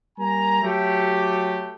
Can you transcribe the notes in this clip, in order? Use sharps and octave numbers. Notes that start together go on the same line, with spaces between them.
G3 A#3 G#5 A#5
F#3 A3 G4